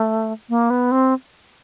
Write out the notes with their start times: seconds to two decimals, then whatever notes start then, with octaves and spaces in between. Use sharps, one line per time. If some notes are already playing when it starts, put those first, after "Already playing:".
Already playing: A3
0.49 A#3
0.70 B3
0.91 C4